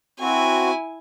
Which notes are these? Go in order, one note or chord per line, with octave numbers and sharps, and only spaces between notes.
C4 E4 F#4 G#5